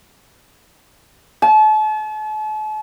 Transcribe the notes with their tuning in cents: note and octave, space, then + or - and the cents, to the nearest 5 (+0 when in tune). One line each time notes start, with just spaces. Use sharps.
A5 -40